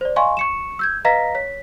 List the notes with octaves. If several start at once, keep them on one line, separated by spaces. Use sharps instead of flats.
C5 D5
D#5 F5 G#5 C6 C#6
C#6 C#7 E7
E6 G6 G#6
B4 D#5 F5 A#5 A#6 B6
C#5 B6